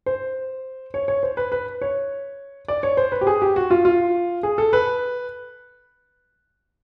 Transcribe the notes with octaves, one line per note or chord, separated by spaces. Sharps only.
C5
C#5
C#5
C5
B4
B4
C#5
D5
C#5
C5
B4
G4
G#4
G4
F#4
F4
F4
G#4
A4
B4